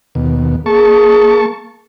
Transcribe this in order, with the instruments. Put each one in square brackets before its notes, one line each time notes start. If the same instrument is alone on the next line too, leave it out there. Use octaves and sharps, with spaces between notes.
[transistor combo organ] D#2 B2
[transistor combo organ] A#3 A5 C#6 [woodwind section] G#4